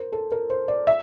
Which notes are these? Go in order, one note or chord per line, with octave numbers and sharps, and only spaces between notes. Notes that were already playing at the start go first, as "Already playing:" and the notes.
Already playing: A#4 C5
A4
A#4
C5
D5
E5